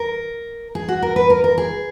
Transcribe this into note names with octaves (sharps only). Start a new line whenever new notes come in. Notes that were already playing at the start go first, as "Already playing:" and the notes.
Already playing: A#4
G#4
F#4
A#4
B4
A#4
A#4
G#4